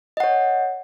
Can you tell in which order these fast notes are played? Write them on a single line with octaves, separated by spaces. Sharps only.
D#5 F#5 C#5